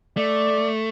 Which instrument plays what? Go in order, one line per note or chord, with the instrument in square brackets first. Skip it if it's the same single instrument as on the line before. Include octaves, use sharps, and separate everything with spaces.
[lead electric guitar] A3 [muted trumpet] D5